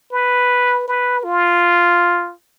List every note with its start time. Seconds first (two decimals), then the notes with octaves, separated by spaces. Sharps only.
0.12 B4
0.88 B4
1.24 F4